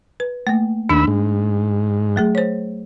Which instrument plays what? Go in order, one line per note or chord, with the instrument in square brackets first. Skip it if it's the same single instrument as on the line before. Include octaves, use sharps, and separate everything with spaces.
[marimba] B4
A3 A#3
[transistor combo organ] D#2 B5 E6 [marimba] D4
[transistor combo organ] G#2
[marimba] F#3 A3 G#4
C5 C#5